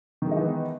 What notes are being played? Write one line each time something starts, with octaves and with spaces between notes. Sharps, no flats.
D#3 E3 G#3 B3 D#4